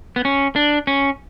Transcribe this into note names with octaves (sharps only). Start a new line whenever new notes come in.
B3
C#4
D4
C#4